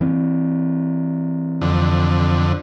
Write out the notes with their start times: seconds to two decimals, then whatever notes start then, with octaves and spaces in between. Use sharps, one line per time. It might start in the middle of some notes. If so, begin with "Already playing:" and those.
0.01 E3 C4
1.61 F2 D3